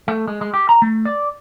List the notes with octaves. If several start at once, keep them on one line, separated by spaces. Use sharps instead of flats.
A3
G#3
G#3
G4
A#5
A3
D5